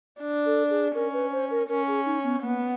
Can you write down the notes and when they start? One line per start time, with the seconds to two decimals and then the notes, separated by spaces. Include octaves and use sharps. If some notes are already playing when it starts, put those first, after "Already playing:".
0.21 D4
0.46 A4
0.70 G#4
0.95 C#4 A#4
1.13 B4
1.32 C5
1.51 A#4
1.69 C#4 A#4
1.87 G#4
2.05 D#4
2.24 B3
2.43 A#3 B3